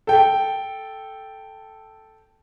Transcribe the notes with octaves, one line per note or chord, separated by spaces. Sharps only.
A4 G5